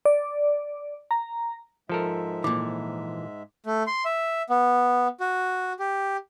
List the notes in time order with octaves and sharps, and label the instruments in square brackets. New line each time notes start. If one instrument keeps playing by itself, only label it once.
[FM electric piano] D5
A#5
[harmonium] G#2 G#3 E5 [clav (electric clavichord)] F3 A4 A#4
[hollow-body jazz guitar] A#2 E3 [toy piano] D6
[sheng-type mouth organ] A3
C6
E5
B3
F#4
G4